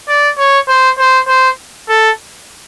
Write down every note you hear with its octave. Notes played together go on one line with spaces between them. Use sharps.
D5
C#5
C5
C5
C5
A4